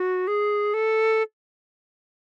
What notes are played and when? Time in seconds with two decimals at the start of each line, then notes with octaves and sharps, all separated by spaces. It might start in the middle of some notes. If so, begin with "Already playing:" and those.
Already playing: F#4
0.27 G#4
0.74 A4